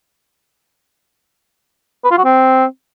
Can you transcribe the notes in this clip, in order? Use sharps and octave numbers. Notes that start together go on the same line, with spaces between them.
B4
F4
F#4
C4